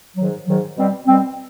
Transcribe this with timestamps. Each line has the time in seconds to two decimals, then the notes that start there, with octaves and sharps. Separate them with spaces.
0.17 G#2 D#3 F#3
0.47 G#2 D#3 F#3
0.76 B2 G3 C4
1.07 B2 G3 C4